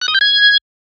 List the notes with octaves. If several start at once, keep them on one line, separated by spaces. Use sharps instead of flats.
F#6
D#6
G6
G#6